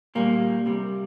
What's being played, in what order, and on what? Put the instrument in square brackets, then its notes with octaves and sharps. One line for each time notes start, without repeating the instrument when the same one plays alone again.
[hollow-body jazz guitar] A#2 G3 A#3
C3 G3